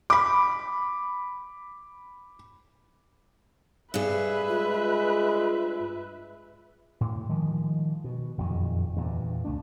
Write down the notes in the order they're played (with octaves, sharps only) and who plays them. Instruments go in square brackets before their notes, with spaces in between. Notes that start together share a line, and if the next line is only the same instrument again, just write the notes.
[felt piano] B5 D6
[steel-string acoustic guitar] G2 G#4 [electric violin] B4 E5
[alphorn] G#3 [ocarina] F4
[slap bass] A2
D#3 F3 G#3
B2
F#1 F2 A#2 D#3
E2 G2 A#2
C#2 A3 D4